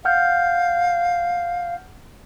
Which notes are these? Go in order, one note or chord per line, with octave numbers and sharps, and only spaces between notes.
F5 F#5 F6 G6